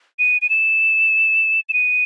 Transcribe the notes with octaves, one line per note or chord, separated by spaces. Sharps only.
D#7
D#7
E7
E7
D#7